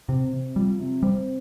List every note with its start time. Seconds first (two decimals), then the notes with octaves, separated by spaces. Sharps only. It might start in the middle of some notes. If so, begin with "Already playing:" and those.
0.08 C3 C4
0.32 C3
0.56 F3 G3
0.80 C3
1.03 G3 C4